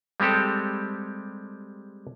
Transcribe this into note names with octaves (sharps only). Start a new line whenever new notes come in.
G3 G#3 C4 G4 A4